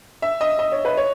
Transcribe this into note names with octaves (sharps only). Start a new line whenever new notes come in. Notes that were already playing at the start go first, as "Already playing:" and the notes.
E5
D#5
D#5
C#5
B4
C#5